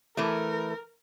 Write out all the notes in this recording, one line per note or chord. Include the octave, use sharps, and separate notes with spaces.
E3 A3 A#4